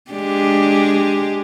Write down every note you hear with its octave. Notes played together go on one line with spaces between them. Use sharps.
G#3 D4 G4